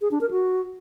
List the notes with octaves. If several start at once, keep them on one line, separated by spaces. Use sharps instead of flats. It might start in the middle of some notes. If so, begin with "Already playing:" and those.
G#4
D4
A#4
F#4